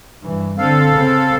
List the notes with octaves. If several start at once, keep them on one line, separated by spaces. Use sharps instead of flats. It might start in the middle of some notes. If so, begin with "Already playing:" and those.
G2 E3
D3 C4 A4 F5
C#3 C4